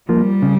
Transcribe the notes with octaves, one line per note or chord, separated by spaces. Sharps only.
F3 G3 A#3
C#3